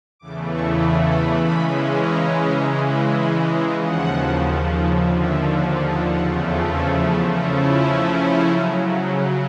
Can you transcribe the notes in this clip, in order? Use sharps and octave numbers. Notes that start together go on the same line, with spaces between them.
E2 C#3 E3 A3 D6
C#6
B5
B5
C#3 E3 G#3 C#4 B5
A#5
C#3 E3 G#3 A#5
B5
B5
A#5
D#2 C#3 F3 F#5
D#2 D3 F3 E5
E5
F5
F#5
E2 C#3 F3 A3 F#5
G5
G#5
C#3 F3 A3 C#4 E4 A#5
A5
G#5
G#5
C#3 F#3 A#5